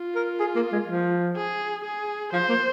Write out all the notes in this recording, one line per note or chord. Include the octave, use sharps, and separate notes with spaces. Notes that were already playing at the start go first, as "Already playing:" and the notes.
Already playing: F4
A#4
G#4
A#3
G#3
F3
G#4
G#4
F3 C5
A#3